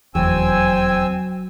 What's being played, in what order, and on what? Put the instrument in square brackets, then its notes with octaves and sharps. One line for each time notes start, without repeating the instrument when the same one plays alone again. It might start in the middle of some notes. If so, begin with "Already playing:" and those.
[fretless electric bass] F1 E2 [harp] F#3 [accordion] C4 G#5 E6 [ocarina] G5